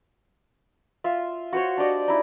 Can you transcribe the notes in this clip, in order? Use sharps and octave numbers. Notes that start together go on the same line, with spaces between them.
F4 E5
F#4 C5 C#5
D4 G4 D5 D#5
D#4 E4